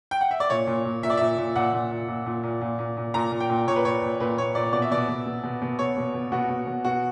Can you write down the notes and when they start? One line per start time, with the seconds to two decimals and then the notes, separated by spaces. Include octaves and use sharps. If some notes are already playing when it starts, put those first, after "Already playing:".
0.11 G5
0.21 F#5
0.31 E5
0.40 D5
0.50 A#2 C#5
0.67 A#2
0.85 A#2
1.03 A#2 E5
1.10 D5
1.17 A#2 E5
1.38 A#2
1.56 A#2 F#5
1.73 A#2
1.91 A#2
2.08 A#2
2.26 A#2
2.43 A#2
2.61 A#2
2.79 A#2
2.97 A#2
3.14 A#2 A#5
3.31 A#2
3.40 G5
3.50 A#2
3.67 A#2 C#5
3.76 B4
3.85 A#2 C#5
4.02 A#2
4.20 A#2 B4
4.38 A#2 C#5
4.55 A#2 D5
4.73 B2 D5
4.82 E5
4.91 B2 D5
5.08 B2
5.26 B2
5.44 B2
5.62 B2
5.78 B2 C#5
5.97 B2
6.14 B2
6.32 B2 F#4
6.49 B2
6.67 B2
6.85 B2 F#4